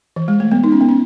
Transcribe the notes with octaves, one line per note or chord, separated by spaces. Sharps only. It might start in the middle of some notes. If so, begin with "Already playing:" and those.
E3
G#3
A3
B3
D#4
C#4
B3
C#4